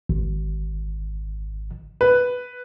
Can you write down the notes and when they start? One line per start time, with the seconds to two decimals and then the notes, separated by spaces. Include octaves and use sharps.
0.09 G#1
2.01 B4